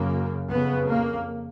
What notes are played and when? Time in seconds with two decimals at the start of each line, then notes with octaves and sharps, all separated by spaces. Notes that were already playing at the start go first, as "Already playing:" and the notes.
Already playing: F#2 C#3 A#3
0.50 F2 C#3 B3
0.89 A#3